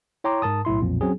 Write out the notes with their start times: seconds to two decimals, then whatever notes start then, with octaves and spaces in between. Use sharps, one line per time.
0.24 E4 C#5 G5 A#5 C6 D6
0.42 G#2 A#4 A5 D#6
0.65 B1 A2 E4 C6
0.81 B1 F2 A#2
1.01 F#3 C4 C#4 G#4